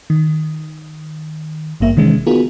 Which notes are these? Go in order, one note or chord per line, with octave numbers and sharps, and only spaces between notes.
D#3
G#1 G2 A#3 E5
C3 D#3 E3 G#3 C#4
B3 D#4 F4 F#4 G#4 A#4